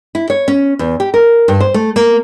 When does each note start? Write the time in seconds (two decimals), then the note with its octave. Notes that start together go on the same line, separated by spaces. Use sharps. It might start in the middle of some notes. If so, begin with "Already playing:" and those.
0.15 E4
0.30 C#5
0.48 C#4
0.79 E2
1.00 G4
1.14 A#4
1.48 G2
1.60 C5
1.74 A3
1.96 A#3